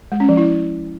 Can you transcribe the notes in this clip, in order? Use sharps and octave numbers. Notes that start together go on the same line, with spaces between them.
G#3
C#4
F3
E4